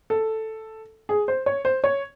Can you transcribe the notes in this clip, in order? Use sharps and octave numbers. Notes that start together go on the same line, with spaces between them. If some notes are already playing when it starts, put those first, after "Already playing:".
A4
G#4
C5
C#5
C5
C#5